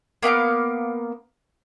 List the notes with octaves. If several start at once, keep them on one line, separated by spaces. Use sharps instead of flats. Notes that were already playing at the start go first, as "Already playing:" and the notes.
A#3 B3 F5 D6